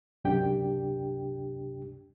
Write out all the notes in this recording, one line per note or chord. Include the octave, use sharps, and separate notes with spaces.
C#2 F#2 C3 D4 G4 G5